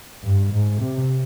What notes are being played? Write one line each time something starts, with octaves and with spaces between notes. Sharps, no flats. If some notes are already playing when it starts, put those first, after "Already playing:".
G2
G#2
C3